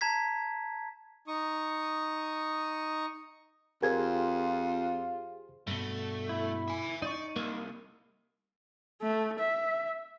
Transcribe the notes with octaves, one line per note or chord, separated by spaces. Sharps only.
A5 A#5 G#6 B6
D#4 C#6 D#6
F2 F4 G4 G#4 A#4 C5 G#6
G2 B2 A3
E4
E5 G#5
D#4 D5 C#6
C2 A#3
A3
E5